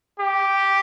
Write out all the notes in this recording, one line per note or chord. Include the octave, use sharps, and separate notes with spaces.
G4